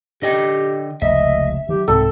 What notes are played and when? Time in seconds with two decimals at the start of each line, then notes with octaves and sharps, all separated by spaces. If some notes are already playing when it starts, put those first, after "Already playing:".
0.22 D3 G4 D#5 G5
1.02 F1 C#2 D#5 E5
1.69 D#3 F#3 G4
1.88 C2 G#2 C4 A4